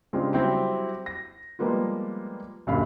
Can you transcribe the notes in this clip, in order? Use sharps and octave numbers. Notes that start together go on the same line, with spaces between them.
C#3 G#3 C4 D4 F4 G4
F#3 G3 C4 E4 F#4 G4
A#6
F3 G3 G#3 A#3 B3 F4
D#1 F#2 D3 F5 B5